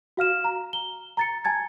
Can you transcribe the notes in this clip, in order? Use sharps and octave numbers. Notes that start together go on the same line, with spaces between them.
F#4 F5 F6 E7
A#5
G7
A#5 A6 C#7
G#5 A5 G#6 A6